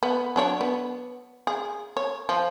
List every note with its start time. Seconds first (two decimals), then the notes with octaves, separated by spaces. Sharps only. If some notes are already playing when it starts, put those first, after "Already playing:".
0.03 B3
0.36 F#3 D4 C#5
0.61 B3
1.47 G#4
1.97 C#5
2.29 F3